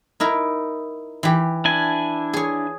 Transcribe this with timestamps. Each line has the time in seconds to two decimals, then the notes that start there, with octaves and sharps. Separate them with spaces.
0.20 D#4 E4 A#4
1.23 E3 G4
1.65 D4 E4 G#5
2.33 G#4 C#5